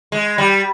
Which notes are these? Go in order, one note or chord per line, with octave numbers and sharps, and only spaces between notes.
G#3
G3